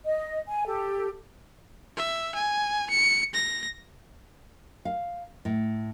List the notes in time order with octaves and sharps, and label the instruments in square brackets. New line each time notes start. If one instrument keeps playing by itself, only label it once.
[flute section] D#5
G#5
G4 A4
[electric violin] E5
G#5
C#7
A#6
[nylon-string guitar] F5
A2